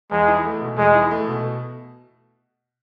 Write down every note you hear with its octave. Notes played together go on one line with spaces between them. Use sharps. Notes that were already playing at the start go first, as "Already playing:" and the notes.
E2 G#3
E4
A3
B2
E2 G#3
E4
A3
B2